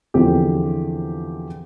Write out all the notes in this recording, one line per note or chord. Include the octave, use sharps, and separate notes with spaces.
E2 D3 F3 C4 G4